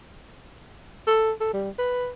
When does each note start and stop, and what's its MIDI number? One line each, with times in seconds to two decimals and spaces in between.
1.07 1.32 69
1.40 1.53 69
1.53 1.70 55
1.78 2.11 71